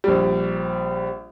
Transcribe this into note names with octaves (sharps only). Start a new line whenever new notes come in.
A#1 G3